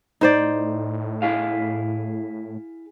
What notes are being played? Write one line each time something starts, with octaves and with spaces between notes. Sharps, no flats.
A2 D#4 C5 D5
E4 G#4 F5